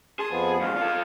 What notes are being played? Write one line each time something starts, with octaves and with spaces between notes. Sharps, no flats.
G#4 A5 C6
F2 F3 B3
C#2 G2 F5
F4 A4